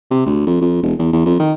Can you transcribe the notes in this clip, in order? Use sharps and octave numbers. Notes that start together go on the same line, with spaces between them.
C3
D2
F2
F2
E1
E2
E2
F2
D#3